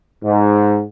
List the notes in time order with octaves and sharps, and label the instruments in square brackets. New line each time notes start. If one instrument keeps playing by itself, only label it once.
[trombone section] G#2